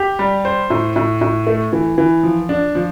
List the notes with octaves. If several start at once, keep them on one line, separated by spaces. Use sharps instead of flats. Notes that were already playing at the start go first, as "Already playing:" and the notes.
Already playing: G4
G3
C5
A2
A2
A2
A3
E3
E3
F3
D4
F3